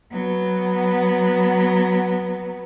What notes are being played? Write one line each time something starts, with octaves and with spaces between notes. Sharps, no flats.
F#3 B3